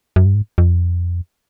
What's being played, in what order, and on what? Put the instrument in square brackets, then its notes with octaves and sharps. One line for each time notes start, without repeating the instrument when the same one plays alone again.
[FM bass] F#2
G2
G#2
F2